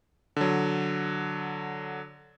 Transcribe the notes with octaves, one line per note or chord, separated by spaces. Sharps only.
D3 F#3